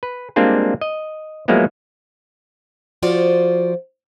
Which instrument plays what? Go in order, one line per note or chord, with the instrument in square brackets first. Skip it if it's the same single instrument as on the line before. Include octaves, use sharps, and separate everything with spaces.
[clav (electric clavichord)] B4
G3 G#3 A#3 C4 D4 F4
D#5
F3 F#3 G#3 A#3 B3 E4
[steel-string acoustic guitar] F3 F4 F#4 C5 D5